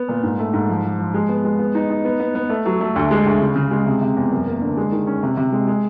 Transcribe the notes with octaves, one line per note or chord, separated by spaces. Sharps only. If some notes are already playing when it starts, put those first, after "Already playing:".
Already playing: B3
A#2
G#2
A3
G#2
F3
F3
F3
G#3
B3
G#3
B3
D#4
D#4
B3
B3
B3
A3
F#3
A3
D2
G#3
D2
C#3
C#3
G#3
C3
C3
E2
F#2
A#3
D3
G#3
D#3
C#4
C3
C3
G#3
G#3